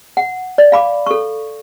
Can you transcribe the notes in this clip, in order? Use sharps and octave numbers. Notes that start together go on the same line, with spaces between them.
F#5
D5
F5 B5 D6
A4 C#6